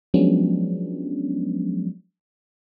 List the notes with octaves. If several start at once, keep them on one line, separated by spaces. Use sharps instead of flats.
F3 F#3 G#3 B3 C#4 D4